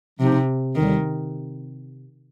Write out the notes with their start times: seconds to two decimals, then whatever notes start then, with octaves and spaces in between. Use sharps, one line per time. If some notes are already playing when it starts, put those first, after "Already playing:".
0.19 C3 F3 C4 D#4 G4
0.75 D#2 D3 D#3 G3